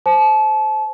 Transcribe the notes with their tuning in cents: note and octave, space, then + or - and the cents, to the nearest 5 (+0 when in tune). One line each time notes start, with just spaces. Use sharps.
C5 +5 A5 -30